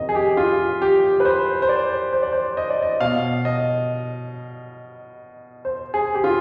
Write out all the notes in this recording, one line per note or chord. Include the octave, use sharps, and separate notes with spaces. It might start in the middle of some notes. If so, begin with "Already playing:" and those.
Already playing: F2 C3 D#3 D#5
G#4
G4
F4
G4
B4
C5
C5
D5
C5
D5
C5
D#5
D5
D#5
B2 F5
D#5
C5
G#4
G4
F4